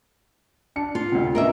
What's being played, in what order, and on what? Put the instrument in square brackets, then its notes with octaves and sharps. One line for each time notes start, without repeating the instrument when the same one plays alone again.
[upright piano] D4 A5 C#7
[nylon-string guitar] F4
[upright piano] D2 C3
[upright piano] B3 C#4 D4 [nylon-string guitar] A#4 D#5 E5